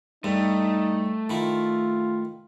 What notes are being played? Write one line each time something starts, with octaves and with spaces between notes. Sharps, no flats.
G2 A3 D#4
D#3 E4 F4